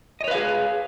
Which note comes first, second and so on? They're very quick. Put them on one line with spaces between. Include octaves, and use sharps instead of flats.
D#5 C#5 B4 F5 G#4